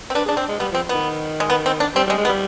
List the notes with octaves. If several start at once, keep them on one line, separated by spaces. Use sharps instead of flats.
C4
D4 B4
D4 G#4
C4 D4
G#3
G3 B3
F3 C4
D#3 B3
G#3
B3
C4
D4
G3 C4
G3 G#3
G#3
B3
G3